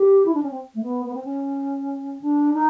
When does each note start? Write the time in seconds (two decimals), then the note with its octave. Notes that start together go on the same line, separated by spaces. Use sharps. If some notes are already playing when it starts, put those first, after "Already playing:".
Already playing: G4
0.25 E4
0.34 D4
0.42 C#4
0.50 C4
0.74 A3
0.82 B3
1.05 B3
1.14 C4
1.24 C#4
2.21 D4
2.53 D#4